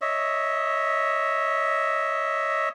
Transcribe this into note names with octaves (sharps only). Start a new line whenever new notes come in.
C#5 D#5 E5